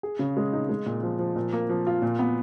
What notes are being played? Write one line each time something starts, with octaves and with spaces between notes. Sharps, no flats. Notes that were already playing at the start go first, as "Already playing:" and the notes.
G#4
C#3
G#3
D#4
G#3
A#2
F3
F3
A#2
A#3
F3
F4
A#2
B3